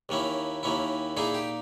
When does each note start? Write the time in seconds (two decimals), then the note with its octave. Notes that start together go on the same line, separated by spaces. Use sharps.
0.09 D#2 D#3 A#3 C#4 E4
0.63 D#2 D#3 A#3 C#4 E4
1.17 A#2 A#3 D#4 E4 G#4
1.34 G4